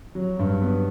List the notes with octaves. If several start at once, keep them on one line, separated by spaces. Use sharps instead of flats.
F#3
G2
B3